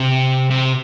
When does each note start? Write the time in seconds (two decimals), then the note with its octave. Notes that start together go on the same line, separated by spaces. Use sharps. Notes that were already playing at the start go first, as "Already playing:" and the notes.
Already playing: C3
0.50 C3